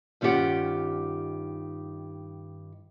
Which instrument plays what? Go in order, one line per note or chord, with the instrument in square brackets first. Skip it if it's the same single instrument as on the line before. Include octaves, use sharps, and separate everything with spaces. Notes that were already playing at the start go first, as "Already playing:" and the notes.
[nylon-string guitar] G2 D#3 C#4 F4 G4 F#5